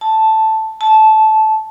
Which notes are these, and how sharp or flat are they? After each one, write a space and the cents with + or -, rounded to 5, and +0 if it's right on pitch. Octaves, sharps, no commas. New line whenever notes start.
A5 +0
A5 -15